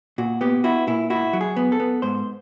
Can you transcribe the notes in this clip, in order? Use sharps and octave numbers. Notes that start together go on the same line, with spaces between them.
A#2 F#4
B3 G4
E4 F#4
A#2 E4
E4 F#4
F#3
G#4
B3
A4
B3
G#2 C5